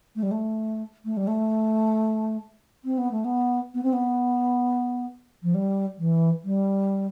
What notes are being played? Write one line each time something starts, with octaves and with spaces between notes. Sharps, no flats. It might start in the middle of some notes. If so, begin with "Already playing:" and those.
A3
G3
A3
A3
G3
A3
C4
B3
A3
B3
B3
C4
B3
F3
G3
E3
G3